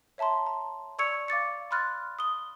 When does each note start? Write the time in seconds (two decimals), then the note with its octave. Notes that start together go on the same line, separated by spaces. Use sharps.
0.18 C#5 E5 A5 A#5 C6
0.47 A#5
0.98 D5 C#6 E6 G#6 C#7 F7
1.28 F5 D6 A6 C#7
1.71 B5 C6 F6 F#6 A6
2.19 D#6 G7